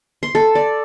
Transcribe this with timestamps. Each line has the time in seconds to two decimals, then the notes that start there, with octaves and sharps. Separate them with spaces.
0.23 C6
0.35 A4
0.55 D5